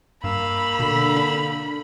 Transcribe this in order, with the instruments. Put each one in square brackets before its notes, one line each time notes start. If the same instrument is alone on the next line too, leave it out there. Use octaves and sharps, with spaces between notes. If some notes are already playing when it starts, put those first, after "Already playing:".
[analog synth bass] G2 [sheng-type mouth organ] A#3 F5 E6 [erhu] B5
[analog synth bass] B2 [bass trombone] D3
[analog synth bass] D4